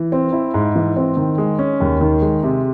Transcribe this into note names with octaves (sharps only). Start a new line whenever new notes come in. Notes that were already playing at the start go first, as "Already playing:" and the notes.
Already playing: E3
C4
E4
G#2
E3
C4
D#3
G#3
C#4
D#2
D#3
G#3
C3